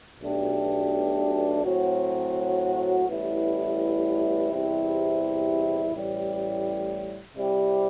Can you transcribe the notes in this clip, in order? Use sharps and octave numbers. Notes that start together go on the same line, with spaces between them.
B1 B2 A3 D4 G4
A2 F#3 C4 F#4
A1 A2 G3 B3 E4
E2 C3 G3 C4 E4
A1 A2 G3
C3 G3 C4 E4 G4